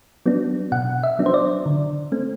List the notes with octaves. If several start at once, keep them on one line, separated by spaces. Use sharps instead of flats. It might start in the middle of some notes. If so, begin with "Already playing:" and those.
F#3 B3 D4
B2 F#5
E5
F#3 B3 D4
C5
D5
D3
A3 C4